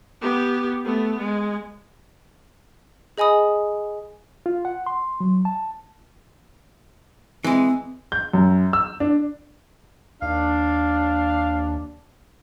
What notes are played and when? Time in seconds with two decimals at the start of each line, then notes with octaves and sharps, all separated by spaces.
0.22 B3 G4
0.85 A3 B3
1.19 G#3
3.18 G#4 D#5 G#5 B5 D#6
4.46 F4
4.65 F#5
4.86 C6
5.20 F#3
5.45 A5
7.44 E3 G#3 C4
8.12 G6
8.33 F#2
8.73 E6
9.00 D4
10.22 D#2 D4 F5